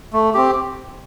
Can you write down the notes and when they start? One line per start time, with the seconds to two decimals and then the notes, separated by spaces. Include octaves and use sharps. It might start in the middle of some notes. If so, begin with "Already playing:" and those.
0.13 A3
0.34 C4 G4